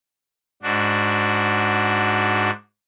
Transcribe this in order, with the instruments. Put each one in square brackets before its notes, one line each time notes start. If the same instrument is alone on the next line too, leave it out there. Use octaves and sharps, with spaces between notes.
[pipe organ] G#2 D4 F#4